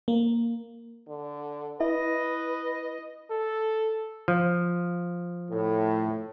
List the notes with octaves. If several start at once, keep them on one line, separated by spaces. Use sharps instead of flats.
A#3
D3
E4 B4 D#5
A4
F3
A2